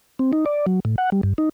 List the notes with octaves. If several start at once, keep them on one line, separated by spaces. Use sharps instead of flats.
C4
D#4
D5
F#3
A2
F#5
G3
G2
D#4